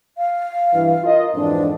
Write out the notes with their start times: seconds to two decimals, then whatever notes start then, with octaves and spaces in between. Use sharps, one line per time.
0.18 F5
0.73 G2 E3
1.04 F4 A#4 D#5
1.35 F2 G#2 E3 D4